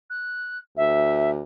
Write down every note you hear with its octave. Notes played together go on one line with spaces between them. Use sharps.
F#6
D2 E5